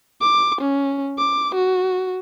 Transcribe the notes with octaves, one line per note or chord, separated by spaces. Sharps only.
D6
C#4
D6
F#4